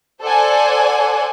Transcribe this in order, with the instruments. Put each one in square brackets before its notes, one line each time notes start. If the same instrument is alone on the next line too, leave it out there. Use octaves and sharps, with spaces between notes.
[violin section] A4 C5 D5 F#5 G#5